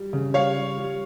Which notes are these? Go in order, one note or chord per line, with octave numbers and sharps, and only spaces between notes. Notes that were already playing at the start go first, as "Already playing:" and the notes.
Already playing: G3
C#3
G3 C#5 F5
G3
G3